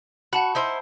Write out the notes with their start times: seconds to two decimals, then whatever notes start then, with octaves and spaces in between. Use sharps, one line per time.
0.33 F#4 F#5 A5 B5
0.55 D#4 E4 C5